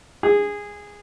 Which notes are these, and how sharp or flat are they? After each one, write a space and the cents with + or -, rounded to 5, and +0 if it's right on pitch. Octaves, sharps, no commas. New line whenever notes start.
G#4 -15